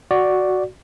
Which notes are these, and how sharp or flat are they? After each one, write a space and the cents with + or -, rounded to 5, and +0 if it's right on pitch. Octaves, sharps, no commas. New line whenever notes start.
F#4 +0 D5 +0